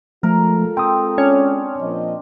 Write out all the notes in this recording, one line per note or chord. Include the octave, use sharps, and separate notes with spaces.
F3 G#3 A3 F4 A4 A#4
C4 G5 D#6
C#4 D4
A#2 F3 D#5